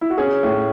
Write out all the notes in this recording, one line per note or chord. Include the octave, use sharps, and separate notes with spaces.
E4
F#4
C#4 G#4
A2